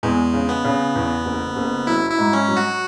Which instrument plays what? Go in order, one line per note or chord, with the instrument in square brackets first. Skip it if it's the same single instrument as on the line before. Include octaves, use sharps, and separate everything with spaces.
[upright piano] E2 [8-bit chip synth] G#3
[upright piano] C#3
[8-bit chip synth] B3
[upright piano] C#3
E2
F#1
F#1
[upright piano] F#3 [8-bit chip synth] E4
[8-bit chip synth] E4
[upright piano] G#2
[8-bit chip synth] C#4
[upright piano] F#3
[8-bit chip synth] F#4